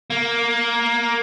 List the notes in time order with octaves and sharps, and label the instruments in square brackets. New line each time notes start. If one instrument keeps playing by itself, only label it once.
[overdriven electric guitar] A#3